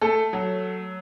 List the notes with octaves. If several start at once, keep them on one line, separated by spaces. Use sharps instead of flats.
A3 A4
F#3